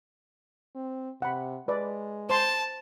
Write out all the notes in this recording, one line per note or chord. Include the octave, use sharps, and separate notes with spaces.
C4
C3 F#5 B5
G#3 B4 D5
C5 A5 C6